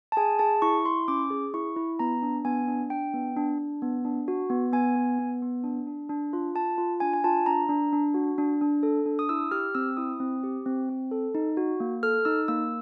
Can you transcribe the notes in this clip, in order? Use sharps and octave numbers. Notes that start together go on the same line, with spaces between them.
A5
G#4 G#5
G#4 A5
E4 C#6
E4 C6
C#4 D6
G#4
E4 C#6
E4
B3 A#5
D4
B3 G#5
D4
D4 G5
B3
D4
D4
B3
D4
F#4
B3
B3 G#5
B3
B3
B3
D4
D4
D4
F4
F4 A5
F4
D4 G#5
G#5
F4 A5
D4 A#5
D4
D4
F#4
D4
D4
A4
D4
D#6
E4 E6
G4 F6
C4 E6
E4 D#6
C4
G4
C4
C4
A4
D#4
F#4
A#3
A4 F6
D#4 E6
A#3 E6